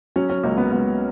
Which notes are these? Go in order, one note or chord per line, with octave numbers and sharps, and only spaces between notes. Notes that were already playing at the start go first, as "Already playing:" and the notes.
F#3 C#4
C#4
C#2 A#3
B3
C#2 B3